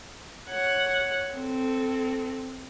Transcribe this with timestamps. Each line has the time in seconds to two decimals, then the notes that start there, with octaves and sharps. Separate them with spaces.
0.49 C#5 F#5
1.34 C4 A4